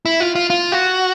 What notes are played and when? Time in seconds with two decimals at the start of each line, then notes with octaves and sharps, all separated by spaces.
0.06 E4
0.20 F4
0.35 F4
0.50 F4
0.72 F#4